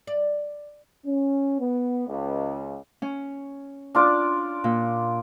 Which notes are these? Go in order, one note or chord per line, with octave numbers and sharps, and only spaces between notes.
D5
C#4
B3
C#2
C#4
D4 F4 D5
A#2